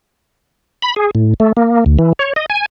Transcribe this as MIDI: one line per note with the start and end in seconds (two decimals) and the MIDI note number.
0.82 0.94 83
0.96 1.11 68
1.15 1.34 45
1.40 1.52 57
1.57 1.84 58
1.86 1.97 38
1.99 2.13 52
2.19 2.33 73
2.36 2.46 75
2.50 2.66 80